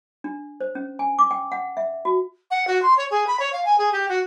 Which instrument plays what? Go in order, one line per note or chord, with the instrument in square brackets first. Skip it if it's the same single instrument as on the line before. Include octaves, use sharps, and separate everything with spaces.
[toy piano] D4
C5
C#4
G#5
D6
G5
F#5
E5
F#4
[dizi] F#5
F#4
C6
C#5
G#4
B5
C#5
F5
G#5
G#4
G4
F#4